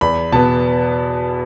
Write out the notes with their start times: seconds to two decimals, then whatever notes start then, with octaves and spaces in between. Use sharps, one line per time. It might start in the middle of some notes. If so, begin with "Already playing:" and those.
0.01 E2 B5
0.32 B2 B3 A5